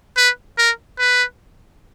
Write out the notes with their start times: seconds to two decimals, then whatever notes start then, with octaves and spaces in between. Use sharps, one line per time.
0.17 B4
0.58 A#4
0.99 B4